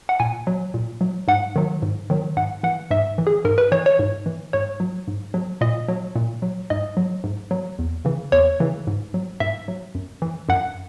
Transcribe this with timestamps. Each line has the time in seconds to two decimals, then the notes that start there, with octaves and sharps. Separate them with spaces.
0.09 F#5
0.20 A#2 G#5
0.47 F#3
0.74 A#2
1.01 F#3
1.28 G#2 F#5
1.56 D#3 F#3
1.82 G#2
2.10 D#3 F#3
2.37 G#2 F#5
2.63 E3 F#5
2.91 G#2 E5
3.18 E3
3.27 G#4
3.45 G#2 A#4
3.58 B4
3.72 E3 C#5
3.86 C#5
3.99 G#2
4.26 E3
4.53 G#2 C#5
4.80 F#3
5.08 G#2
5.34 F#3
5.61 A#2 D#5
5.88 F#3
6.16 A#2
6.42 F#3
6.70 G#2 D#5
6.97 F#3
7.24 G#2
7.51 F#3
7.79 E2
8.05 C#3 E3
8.32 E2 C#5
8.60 C#3 E3
8.87 G#2
9.14 F#3
9.40 G#2 E5
9.68 F#3
9.95 F#2
10.22 E3
10.49 F#2 F#5